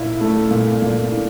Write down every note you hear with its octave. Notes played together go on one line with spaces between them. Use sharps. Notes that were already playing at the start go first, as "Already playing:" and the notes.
Already playing: A#2 E4
A3
A#2
A#2
E4